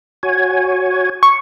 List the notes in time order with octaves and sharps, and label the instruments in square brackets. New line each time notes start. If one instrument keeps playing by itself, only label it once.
[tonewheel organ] F#4 C#5 G#5
[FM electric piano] C#6